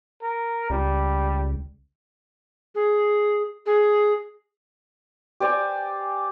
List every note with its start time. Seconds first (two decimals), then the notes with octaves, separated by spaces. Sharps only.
0.22 A#4
0.70 C#2 G3
2.75 G#4
3.66 G#4
5.40 G4 C5 D5 G#5